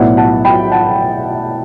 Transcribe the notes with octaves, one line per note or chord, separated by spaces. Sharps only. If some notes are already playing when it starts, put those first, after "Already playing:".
Already playing: B1 A2 F#3 B3 E4 D5 F#5
F#5 A5
G5 B5
F#5 A5